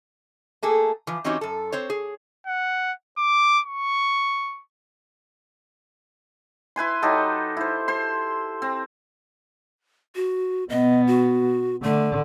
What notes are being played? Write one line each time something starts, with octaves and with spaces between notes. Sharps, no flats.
A3 A#3 G#4 A4
E3 F3
E3 C4 C#4 D#4 F#4 G4
F#2 A4
C4 C5 C#5
G#4
F#5
D6
C#6
E4 B4 G#5 C6
F#3 D#4 G4 A4
E4 C5
C5 C6
C4
F#4
B2 B3 D#5
F#4
D3 A3